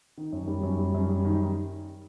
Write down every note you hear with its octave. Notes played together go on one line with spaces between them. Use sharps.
D#3
F#2
G3
F#2
G3
F#2
G3
D#3